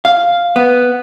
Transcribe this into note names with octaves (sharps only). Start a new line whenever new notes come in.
F5
B3